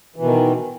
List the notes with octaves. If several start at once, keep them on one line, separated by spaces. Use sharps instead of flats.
B2 D#3 E3